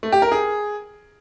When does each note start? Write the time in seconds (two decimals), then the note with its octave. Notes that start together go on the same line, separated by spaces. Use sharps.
0.03 A3
0.12 G4
0.22 A#4
0.32 G#4